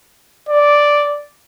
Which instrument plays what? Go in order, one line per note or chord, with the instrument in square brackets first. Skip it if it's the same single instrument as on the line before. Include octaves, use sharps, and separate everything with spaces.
[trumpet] D5